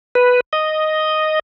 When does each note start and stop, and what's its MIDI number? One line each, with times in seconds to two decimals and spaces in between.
0.15 0.40 71
0.53 1.39 75